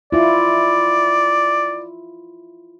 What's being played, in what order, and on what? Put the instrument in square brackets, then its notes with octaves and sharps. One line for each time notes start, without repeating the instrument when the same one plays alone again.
[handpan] E4 F4 [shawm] D5